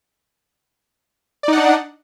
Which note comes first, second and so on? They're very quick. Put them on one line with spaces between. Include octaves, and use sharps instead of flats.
D5 D#4 F#5 D4